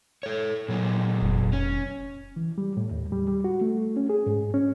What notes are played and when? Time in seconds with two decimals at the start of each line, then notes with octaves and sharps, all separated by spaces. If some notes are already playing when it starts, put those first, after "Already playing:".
0.23 A4 C#5
0.68 A#2 F#3 D#4
1.22 F1
1.53 C#4
2.36 E3
2.58 G3
2.77 A2
2.91 D#2
3.12 G3
3.28 G3
3.44 F#4
3.61 A3
3.97 C#4
4.09 G#4
4.27 G#2
4.54 C#4